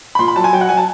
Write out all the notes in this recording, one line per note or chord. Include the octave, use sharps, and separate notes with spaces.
B5
A#2 C6
B5
F#3 A5
G#5
F#3 G5
F#5
F#3 G#5
A5